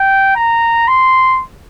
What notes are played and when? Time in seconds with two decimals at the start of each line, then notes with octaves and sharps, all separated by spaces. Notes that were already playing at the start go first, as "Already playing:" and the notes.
Already playing: G5
0.36 A#5
0.88 C6